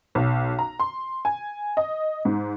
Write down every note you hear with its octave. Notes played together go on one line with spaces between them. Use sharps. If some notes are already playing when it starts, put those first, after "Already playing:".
B1
A#5
C6
G#5
D#5
G#2